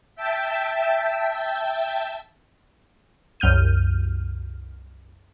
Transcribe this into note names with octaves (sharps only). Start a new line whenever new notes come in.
E5 G5 A5
C2 F#2 F6 G6 D#7